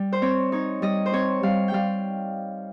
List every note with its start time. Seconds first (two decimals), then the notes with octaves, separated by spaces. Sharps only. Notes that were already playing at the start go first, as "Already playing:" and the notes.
Already playing: G3
0.13 C5
0.22 C4 C#5
0.52 D#4 C#5
0.82 G3 D#5
1.06 C5
1.13 C4 C#5
1.43 G3 F5
1.68 G5
1.73 G3 F5